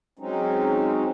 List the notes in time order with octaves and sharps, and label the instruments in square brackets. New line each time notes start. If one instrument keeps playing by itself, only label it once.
[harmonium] F#3 G#3 C4 C#4 D#4